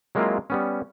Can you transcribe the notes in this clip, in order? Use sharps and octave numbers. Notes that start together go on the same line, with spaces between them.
F#3 G#3 A#3 C4 E4 F4
G3 B3 C#4